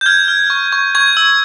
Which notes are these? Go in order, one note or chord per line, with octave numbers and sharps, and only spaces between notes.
G6
F6 G#6
F6
C#6
C#6
C#6 G#6
E6